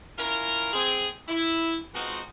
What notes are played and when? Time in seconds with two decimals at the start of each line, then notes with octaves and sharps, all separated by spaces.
0.17 C#4 E4 F4 A#4
0.73 C4 G#4
1.28 E4
1.93 F3 G#3 B3 C4 D#4 F#4